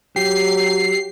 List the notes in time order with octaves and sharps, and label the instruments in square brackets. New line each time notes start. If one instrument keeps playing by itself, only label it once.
[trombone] F#3 [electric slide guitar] G4 [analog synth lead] C7